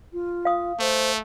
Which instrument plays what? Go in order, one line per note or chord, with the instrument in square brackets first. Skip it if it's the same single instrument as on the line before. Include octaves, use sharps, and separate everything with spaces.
[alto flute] F4
[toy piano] F5 D#6
[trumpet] A3 [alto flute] C5